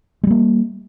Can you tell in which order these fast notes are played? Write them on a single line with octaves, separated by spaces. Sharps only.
G#3 G3 A#3